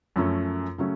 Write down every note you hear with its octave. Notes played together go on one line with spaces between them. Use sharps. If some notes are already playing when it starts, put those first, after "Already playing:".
F#2 F3 A3 C#4
C#3 F#3 A3 C#4